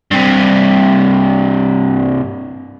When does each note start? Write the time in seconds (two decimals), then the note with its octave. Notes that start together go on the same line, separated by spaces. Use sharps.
0.11 G2 C3